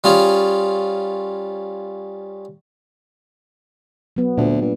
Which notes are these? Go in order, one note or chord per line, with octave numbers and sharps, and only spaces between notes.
G3 C#4 F4 G#4
F#3 B3
D2 A#2
G2